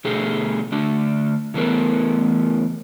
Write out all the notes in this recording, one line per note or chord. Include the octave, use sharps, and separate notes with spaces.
B2 D3 A3 G4 G#4
D3 A3 D4
C#3 E3 A3 B3 A#4